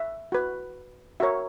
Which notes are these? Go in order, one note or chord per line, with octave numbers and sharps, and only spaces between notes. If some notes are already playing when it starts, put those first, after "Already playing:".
Already playing: E5
F#4 B4
F#4 A#4 C#5 E5